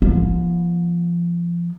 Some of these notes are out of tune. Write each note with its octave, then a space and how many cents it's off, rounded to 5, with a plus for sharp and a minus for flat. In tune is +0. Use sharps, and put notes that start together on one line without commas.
F3 -25 B3 -45